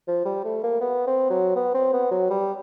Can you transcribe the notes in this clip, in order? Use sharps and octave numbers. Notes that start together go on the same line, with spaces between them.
F3
G3
A3
A#3
B3
C4
F#3
B3
C4
B3
F#3
G3